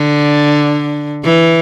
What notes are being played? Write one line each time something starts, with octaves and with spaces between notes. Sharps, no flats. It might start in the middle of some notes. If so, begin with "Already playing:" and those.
Already playing: D3
E3